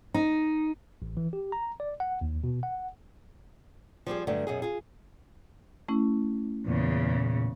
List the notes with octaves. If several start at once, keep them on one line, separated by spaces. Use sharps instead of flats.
D#4
A1
E3
G4
A#5
D5
F#5
D#2
B2
F#5
F3 G3 C4 G#4
G2 D3 F#3 A3
F#2 B2 G#4
F4 G#4
A3 C#4 E4
E2 A#2 C#3